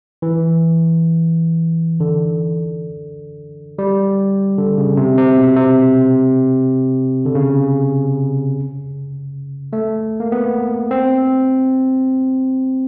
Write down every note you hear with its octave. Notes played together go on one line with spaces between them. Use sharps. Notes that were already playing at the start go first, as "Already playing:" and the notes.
E3
D3
G3
D3
C#3
C3
C3
B2
C3
D3
C#3
A3
A#3
B3
C4